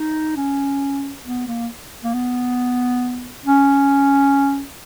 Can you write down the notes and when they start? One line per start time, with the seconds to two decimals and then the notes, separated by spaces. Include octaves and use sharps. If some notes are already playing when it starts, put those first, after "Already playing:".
Already playing: D#4
0.36 C#4
1.25 B3
1.48 A#3
2.04 A#3
2.14 B3
3.45 C#4